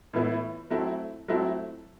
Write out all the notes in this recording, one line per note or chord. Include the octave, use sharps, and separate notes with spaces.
A2 E3 B3 E4
F#3 A3 C4 E4
F#3 A3 C4 E4